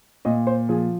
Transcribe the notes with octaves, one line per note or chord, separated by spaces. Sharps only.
A#2 D#5
C5
F3 G#4